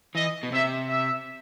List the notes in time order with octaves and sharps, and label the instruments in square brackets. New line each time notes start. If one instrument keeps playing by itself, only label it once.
[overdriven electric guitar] E3 [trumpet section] D#5
[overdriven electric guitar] B2
[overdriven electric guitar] C3 [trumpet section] E5
[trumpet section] E5